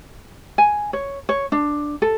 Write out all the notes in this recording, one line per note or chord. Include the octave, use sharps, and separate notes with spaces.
G#5
C#5
C#5
D4
A4